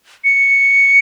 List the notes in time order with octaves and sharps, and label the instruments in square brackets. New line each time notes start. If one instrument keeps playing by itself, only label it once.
[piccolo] C#7